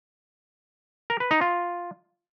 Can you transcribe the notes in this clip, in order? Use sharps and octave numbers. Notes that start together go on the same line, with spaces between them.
A#4
B4
D#4
F4